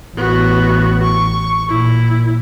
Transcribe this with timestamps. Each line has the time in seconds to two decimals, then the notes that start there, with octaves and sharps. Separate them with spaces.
0.17 A1 B3 F#4
1.04 C#6
1.69 A#2 E4